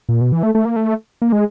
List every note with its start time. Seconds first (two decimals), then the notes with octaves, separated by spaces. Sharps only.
0.09 A#2
0.21 B2
0.32 E3
0.43 A3
0.55 A3
0.65 A#3
0.76 A3
1.22 A#3
1.32 G#3